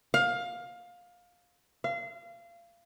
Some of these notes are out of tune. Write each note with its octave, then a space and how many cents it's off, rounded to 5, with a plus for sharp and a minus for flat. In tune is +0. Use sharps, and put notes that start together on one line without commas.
F5 +20
F5 -30